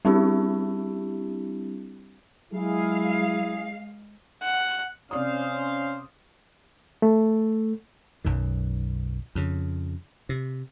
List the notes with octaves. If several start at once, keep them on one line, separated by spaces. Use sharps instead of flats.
G3 C4 D4 E4 G4
F#3 G#3 E4 G#4 F5
F#5
C3 C#4 C5 D5 F5 D#6
A3
B1 F#2 D#3
F2 C#3
C3